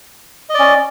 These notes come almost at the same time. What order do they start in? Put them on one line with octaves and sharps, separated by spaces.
D#5 D5 C#4